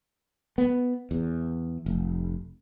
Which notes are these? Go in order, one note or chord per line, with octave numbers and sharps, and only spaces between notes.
B3
E2
F1